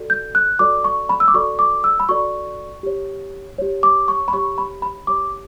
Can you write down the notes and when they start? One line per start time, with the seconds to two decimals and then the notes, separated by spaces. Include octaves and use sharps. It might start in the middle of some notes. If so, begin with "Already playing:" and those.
Already playing: F#4 A4 D5
0.10 G6
0.35 F#6
0.59 F#4 A4 D5 D6
0.84 C#6
1.09 B5
1.20 E6
1.28 D6
1.34 F#4 A4 D5 C#6
1.59 D6
1.84 E6
2.00 B5
2.09 F#4 A4 D5 C#6
2.83 G4 C#5
3.58 G4 C#5
3.83 D6
4.08 C#6
4.28 B5
4.33 G4 C#5 C#6
4.58 B5
4.82 B5
5.07 G4 C#5 D6